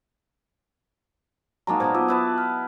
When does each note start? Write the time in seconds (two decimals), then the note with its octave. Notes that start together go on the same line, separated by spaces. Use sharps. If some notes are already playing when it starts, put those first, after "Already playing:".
1.67 F#3 G#3 A#3 D#4 A5 A#5
1.80 A#2 B3 C5 A5 G#6
1.95 F4 D#5 D6 E6
2.08 E4 B4 A5
2.38 F6